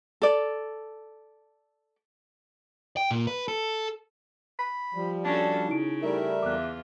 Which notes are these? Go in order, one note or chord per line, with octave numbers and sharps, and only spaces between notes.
A4 D5
G5
A#2
B4
A4
B5
F3 G3
C#4 D4 F#4 A4
C#3 D#4 E4 D7
G3 A3 A#4 E5
E2 F4 D6 F#6